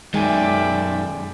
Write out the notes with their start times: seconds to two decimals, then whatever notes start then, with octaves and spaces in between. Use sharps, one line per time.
0.14 F#2 D#3 G#3 G#4 D5 E5 G5 G#5